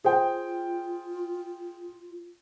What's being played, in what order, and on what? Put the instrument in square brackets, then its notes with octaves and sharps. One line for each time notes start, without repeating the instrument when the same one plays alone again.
[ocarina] F4 [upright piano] G#4 C5 G5